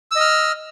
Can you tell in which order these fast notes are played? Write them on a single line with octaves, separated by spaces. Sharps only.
E6 D#5 F6